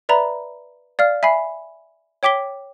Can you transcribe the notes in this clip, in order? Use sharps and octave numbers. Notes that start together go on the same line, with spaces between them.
B4 D5 E5 A#5 B5
D5 F5 F6
E5 G#5 B5 C7
C#5 G5 D6 B6 G7